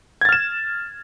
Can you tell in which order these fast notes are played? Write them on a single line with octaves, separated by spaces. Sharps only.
G#6 A6 F6 E7